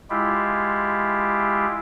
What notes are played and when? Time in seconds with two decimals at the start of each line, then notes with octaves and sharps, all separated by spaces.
0.10 G#3 E4 F4 G4